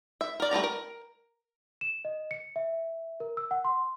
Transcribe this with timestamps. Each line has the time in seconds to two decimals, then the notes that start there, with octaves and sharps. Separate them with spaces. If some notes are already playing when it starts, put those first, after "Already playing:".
0.21 E5
0.40 A#4 D5
0.51 G3 A3 D4 A#5
0.64 A#4
1.81 E7
2.05 D#5
2.31 C#7
2.56 E5
3.20 A#4
3.37 E6
3.51 F#5
3.65 C6